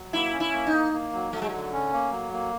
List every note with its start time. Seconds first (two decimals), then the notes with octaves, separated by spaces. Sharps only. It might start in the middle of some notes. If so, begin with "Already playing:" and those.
Already playing: F#3
0.13 A#3 E4
0.33 C#4
0.40 E4
0.53 A#3
0.67 D#4
0.72 A#3
0.93 A#3
1.13 F#3
1.33 F#3 A3
1.42 G#3
1.49 D3 A3
1.73 C#4
1.93 A#3
2.12 F#3
2.33 A#3